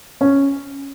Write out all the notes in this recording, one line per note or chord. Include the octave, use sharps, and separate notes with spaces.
C#4